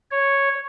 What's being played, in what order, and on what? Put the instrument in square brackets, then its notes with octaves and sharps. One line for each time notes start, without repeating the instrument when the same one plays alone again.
[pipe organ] C#5